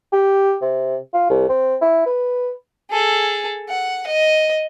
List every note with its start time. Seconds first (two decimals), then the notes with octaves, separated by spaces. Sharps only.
0.13 G4
0.61 C3
1.14 F4
1.30 C2
1.49 C4
1.81 E4
2.06 B4
2.91 G#4 A4
3.69 F#5
4.06 D#5